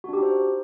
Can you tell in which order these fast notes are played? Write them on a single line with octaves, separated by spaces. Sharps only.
F#4 D4 G4 D#4 C5